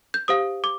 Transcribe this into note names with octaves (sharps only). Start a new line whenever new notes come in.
G6
G4 C5 F5 D#6
D6